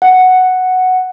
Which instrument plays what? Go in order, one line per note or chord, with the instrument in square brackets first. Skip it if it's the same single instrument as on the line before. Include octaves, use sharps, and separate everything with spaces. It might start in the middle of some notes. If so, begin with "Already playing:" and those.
[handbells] F#5